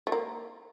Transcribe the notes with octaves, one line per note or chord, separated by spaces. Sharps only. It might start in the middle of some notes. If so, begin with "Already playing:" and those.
A3
A#3